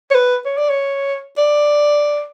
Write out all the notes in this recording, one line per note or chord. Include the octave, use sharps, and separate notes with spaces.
C#5
B4
C#5
D5
C#5
D5